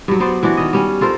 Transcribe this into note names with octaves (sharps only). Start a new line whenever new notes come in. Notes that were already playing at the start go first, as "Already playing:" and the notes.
G2 F#3
B3 C5 D5
E3 D4 F#4
D#3 D#5
G3 C#4
F4 A4 A#4 C5